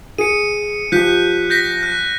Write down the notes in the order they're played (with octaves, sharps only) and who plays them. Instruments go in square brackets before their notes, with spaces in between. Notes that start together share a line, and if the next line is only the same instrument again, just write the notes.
[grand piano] G#4 [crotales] C#7 D#7
[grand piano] F3 G4 [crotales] F#6 G6 B6
[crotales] G6 A#6 B6
F#6